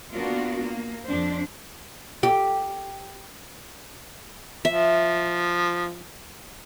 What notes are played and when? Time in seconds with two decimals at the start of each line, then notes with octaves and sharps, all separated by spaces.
0.13 A#3 B3 D4 F4 F#4 A#4
0.63 A#3
1.06 F2 D4 C5
2.23 G4
4.65 F3 E5